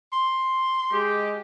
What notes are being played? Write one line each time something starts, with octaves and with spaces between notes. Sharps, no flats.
C6
G#3 G4